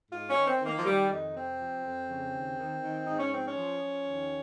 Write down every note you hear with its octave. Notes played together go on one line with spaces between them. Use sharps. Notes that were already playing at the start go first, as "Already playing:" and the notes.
G#2 F4
C#4
D#3
C4
D#3
A#3
F3
D#3 G3
F2 D#4
C3 C4
F3
F2
C#3
D#2
D#3
D#3
G#2 D#4
C#4
F3 C4
C#4
F3
F3
D#2